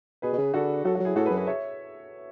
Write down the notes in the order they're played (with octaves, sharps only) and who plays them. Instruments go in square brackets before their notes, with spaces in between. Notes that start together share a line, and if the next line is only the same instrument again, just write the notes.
[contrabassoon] B2 [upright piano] G#4 B4
[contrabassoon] B2
C#3
[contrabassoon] D3 [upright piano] F#4 A4
[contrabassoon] F#3 [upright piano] F#4 A4
[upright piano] F#4 A4
[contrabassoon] F#3 [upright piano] E4 G#4
[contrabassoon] A2 [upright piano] F#4 A4
[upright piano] G#4 B4
[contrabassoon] F#2
[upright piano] G#4 B4
C#5 E5